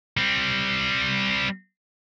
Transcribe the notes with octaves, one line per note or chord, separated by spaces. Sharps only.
G3 C4